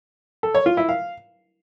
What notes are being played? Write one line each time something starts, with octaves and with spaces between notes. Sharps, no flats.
A4
C#5
F4
E4
F5